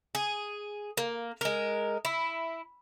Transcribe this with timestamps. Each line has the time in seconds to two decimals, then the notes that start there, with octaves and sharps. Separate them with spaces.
0.15 G#4
0.97 A#3
1.41 G#3 A#4
2.05 E4